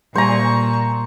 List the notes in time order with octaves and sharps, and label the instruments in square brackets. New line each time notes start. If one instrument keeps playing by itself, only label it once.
[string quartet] A#2 [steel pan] G3 G#5 [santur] C5 A#5 [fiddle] C#6